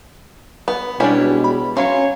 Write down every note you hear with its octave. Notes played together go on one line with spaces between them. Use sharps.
B3
B2 G3 G#3 C#4 D4 E4
B5
F#3 C#4 C#5 E5 F5 C6